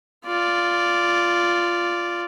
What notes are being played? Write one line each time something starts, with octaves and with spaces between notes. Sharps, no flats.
F4 D5